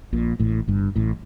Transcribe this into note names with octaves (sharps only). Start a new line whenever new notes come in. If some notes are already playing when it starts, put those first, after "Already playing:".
A#1 A#2
A1 A2
G1 G2
A1 A2